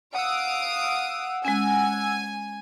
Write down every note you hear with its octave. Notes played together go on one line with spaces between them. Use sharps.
F5 F#5 D#6 E6 D7
G#3 C#4 G#5